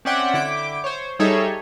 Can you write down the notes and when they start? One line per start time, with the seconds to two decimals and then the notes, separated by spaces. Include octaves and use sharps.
0.05 C4 C#4 D5 E5 F#5 G5
0.34 D3 E4 G5 D6
0.84 C5 C#5
1.19 G3 D#4 G#4 A4 C#5 E5